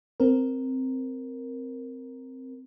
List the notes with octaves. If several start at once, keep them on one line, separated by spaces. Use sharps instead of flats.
C4 A#4